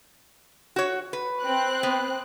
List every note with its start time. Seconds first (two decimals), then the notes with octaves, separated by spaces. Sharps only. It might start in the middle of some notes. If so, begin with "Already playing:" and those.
0.76 F#4 C#5
1.13 B4
1.42 C4 F#6
1.83 B3